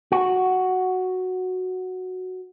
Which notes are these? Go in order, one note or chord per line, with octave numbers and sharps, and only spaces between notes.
F#4